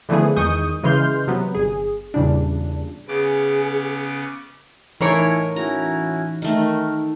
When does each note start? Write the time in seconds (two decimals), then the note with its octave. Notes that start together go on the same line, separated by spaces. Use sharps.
0.09 D3 E3 F3 A3 B3 G#4
0.36 E2 D#3 G#3 C#6 D#6 G6
0.84 C#3 E3 G#3 C6 F6 G6
1.27 C3 F#3 B3
1.55 G1 G#4
2.14 E2 A#2 C#3 G3 D4
3.08 C#3 B3 G#4 D6
5.01 A2 E3 D#4 E4 A#4 C#5 G#5
5.56 C#4 E4 F#4 A#5
6.42 D#3 A3 A#4